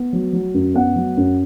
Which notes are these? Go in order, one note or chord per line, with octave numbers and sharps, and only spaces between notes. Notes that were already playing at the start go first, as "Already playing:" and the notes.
Already playing: B3
F#3
F#3
F#2
B3 F#5
F#3
F#2